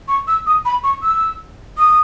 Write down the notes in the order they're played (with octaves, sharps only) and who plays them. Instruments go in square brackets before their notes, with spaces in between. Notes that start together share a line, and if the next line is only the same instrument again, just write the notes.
[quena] C#6
E6
D#6
B5
C#6
E6
D#6